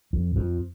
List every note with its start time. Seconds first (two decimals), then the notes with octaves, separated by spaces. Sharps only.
0.13 F2
0.36 F2